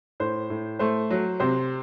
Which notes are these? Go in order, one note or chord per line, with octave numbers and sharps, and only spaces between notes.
A2 C5
A2
A3 C5
F#3
C3 C5